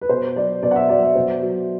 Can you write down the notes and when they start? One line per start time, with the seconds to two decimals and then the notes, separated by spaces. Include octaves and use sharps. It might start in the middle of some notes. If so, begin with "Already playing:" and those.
0.01 B4
0.09 B2 C5
0.36 F#3 D5
0.62 B2 D5
0.71 F#5
0.76 E5
0.89 F#3 D5
1.02 E5
1.16 B2 C5
1.42 F#3